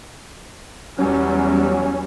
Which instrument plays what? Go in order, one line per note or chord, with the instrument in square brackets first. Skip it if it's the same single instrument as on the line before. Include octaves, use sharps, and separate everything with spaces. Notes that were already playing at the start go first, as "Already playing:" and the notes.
[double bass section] E2 F#3 G3 [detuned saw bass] C#4